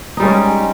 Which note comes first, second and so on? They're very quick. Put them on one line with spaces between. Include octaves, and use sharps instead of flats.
D#4 G3 G#3 C#4